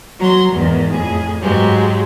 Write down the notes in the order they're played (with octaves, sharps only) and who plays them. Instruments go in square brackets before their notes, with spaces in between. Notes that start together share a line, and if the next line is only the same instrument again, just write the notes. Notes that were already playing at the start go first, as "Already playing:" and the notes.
[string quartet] F#3 A#5 C6
E2 G#2 D#3
F2 A2 G#4
G#2 F#3 G#3 G4